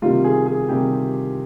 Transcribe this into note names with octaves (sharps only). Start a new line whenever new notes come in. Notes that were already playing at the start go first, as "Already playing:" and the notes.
C3 D#3 G3 F4
G#4
G#4
C3 D#3 G3 G4